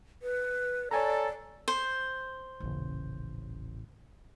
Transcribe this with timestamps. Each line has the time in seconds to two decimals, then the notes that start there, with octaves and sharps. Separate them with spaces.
0.22 B4
0.91 A4 C#5 D5 G#5 A#5
1.68 C5
2.60 D#1 A1 C#3